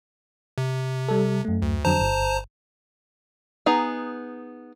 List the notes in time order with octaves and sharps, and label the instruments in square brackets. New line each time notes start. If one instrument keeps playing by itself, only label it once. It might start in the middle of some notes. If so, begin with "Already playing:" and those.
[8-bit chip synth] C3
[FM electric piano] G3 A4
F#2 A3
[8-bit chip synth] D2
[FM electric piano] F2 D3 F#3 [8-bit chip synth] C5 A5 A#5
[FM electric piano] G1
[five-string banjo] B3 D#4 G#4 A#5